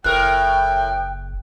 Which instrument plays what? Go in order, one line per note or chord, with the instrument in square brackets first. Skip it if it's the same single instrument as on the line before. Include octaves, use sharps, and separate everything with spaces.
[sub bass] F#1 [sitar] A2 A#4 [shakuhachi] G5 [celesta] F#6